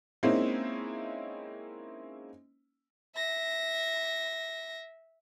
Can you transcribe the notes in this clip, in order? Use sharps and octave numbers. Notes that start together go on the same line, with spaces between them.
G#3 A#3 C4 C#4 D#4 E4
E5 A#6